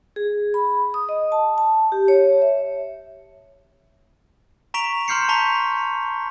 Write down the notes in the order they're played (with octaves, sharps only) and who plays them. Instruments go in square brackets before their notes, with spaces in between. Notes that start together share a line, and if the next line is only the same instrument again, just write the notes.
[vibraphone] G#4
B5
D#6
D#5
A5
A5
G4
C#5
E5
[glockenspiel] A#5 C#6 B6 D7 F7
A#5 C6 F6 G6 C7 C#7
A5 A#5 C#6 B6 F7